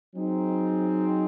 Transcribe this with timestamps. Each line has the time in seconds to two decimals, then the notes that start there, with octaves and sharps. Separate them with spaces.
0.15 F#3 C4 D#4 G#4